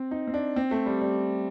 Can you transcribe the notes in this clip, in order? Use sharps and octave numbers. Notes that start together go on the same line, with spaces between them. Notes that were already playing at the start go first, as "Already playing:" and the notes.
Already playing: C4
D#4
C4
D4
C4
A3
G3
G3